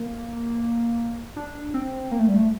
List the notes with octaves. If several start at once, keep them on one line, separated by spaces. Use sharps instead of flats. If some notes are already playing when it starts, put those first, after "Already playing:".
Already playing: A#3
D4
C4
A#3
A3
G3
A3